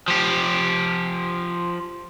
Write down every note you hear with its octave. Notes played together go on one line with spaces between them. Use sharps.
F3 G4